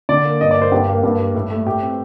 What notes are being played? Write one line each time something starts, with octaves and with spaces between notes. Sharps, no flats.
D3 D5
A#3
G2 D#5
D5
A#3
C5
G2 G4
A#3
G2
G3
A2
A3
A2 G4
C4